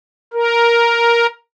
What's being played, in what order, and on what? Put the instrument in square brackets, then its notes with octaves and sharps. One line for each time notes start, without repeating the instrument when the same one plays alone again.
[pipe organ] A#4